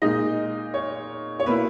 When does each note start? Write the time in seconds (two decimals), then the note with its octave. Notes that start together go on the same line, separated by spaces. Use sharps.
0.02 A#2 G#3 D#4 D#5
0.74 C#5
1.40 C#5
1.46 B2 A#3 E4 B4